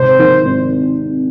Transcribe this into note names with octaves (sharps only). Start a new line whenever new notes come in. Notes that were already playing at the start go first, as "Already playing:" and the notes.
Already playing: G#1 C3 C5
D#3
G#1